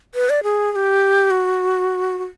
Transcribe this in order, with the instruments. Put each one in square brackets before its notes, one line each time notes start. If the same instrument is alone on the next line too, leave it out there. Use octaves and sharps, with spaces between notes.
[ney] B4
D5
G#4
G#4
G4
F#4
F#4